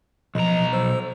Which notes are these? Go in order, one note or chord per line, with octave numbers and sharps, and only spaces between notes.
B1 F3 D#5 A#5
C5 E6